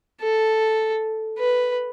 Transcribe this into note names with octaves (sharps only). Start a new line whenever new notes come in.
A4
B4